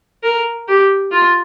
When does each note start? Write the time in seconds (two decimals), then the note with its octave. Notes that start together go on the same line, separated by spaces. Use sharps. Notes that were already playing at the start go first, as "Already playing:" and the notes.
0.23 A#4
0.68 G4
1.11 F4